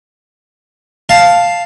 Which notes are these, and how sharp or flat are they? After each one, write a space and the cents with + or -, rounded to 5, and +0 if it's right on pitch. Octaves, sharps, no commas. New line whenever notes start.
F5 +0 A5 +0